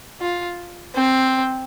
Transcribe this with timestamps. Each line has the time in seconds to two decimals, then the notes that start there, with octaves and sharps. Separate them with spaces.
0.21 F4
0.95 C4